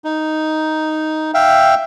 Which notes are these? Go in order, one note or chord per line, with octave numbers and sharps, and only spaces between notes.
D#4
E5 F5 G5